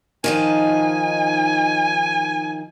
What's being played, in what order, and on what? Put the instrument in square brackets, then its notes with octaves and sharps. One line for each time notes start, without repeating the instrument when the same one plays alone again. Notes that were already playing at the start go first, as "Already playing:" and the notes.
[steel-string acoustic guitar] D#3 F3 D#4 [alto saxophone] G#5